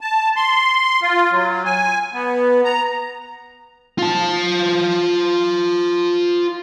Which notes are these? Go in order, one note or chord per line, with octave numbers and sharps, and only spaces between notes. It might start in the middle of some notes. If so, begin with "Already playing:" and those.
A5
C6
F4
F#3
G#5
B3
A#5
F4 A5